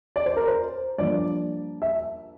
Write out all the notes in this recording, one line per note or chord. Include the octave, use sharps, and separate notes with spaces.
D5
C5
A#4
C5
G2 F3 A#3 D5
E5